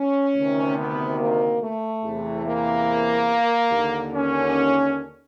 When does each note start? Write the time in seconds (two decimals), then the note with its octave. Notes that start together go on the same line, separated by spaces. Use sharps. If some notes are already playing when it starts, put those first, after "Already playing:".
Already playing: C#4
0.36 D2 C3 D#3
0.78 B3
1.20 A#3
1.62 A3
2.04 E2 C3 E3
2.46 A#3
3.72 D#2 D3
4.14 C#4